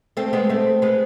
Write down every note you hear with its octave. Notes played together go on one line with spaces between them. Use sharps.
A3 C4
G#3 B3
A3 C4
G#3 B3